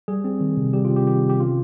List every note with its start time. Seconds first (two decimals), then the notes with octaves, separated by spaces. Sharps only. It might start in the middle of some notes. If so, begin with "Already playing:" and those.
0.08 G3 G#4
0.24 C4
0.41 D#3
0.57 C3
0.73 G3 G4
0.85 F4
0.90 C4
0.96 G4
1.07 D#3 G4
1.24 C3
1.30 G4
1.40 C#4 F4